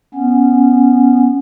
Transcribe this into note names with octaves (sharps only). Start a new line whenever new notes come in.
B3 C#4